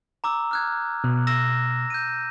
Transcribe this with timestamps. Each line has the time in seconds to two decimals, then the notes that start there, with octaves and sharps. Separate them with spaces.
0.24 A#5 D6 E6
0.51 F6 F#6 G#6
1.04 B2
1.27 E6 A#6 E7
1.90 G6 D#7